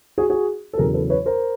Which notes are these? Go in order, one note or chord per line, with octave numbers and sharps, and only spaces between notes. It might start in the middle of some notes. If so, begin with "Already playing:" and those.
F#4 G#4
F#4 G#4
A4
E2 C#3 F#3 G#4 A#4
A4 B4
B4 C#5
A#4 C5